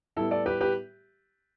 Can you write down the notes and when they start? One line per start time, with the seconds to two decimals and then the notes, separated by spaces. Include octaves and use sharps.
0.16 A2 G3 B3 E4 A4
0.31 A4 D5
0.46 G4 B4
0.61 G4 B4